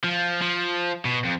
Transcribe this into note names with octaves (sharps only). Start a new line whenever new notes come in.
F3
F3
B2
F2